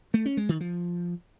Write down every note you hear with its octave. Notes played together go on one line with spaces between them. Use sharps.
A3
C#4
G#3
D#3
F3